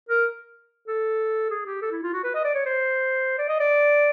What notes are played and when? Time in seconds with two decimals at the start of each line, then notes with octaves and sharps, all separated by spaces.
0.09 A#4
0.88 A4
1.50 G#4
1.66 G4
1.82 A4
1.92 E4
2.03 F4
2.13 F#4
2.24 B4
2.35 D#5
2.45 D5
2.54 C#5
2.66 C5
3.38 D5
3.48 D#5
3.60 D5